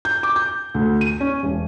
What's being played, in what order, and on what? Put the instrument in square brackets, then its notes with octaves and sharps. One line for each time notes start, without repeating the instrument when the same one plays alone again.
[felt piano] G6
D6
G6
D2
D#7
C#4
E1